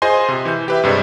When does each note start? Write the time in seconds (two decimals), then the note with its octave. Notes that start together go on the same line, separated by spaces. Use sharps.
0.02 F4 G#4 C5 D#5 G#5 C6
0.28 C3
0.45 E3 G6
0.68 G4 B4 E5
0.83 G2 C3 G3 G#3